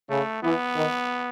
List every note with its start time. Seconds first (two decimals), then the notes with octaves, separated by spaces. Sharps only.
0.10 C#3 A3
0.43 E3 B3
0.76 D#3